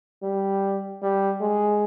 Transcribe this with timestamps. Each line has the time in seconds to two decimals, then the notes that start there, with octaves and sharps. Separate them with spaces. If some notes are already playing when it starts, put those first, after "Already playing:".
0.23 G3
1.03 G3
1.41 G#3